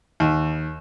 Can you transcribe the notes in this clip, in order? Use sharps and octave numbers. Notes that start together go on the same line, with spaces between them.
D#2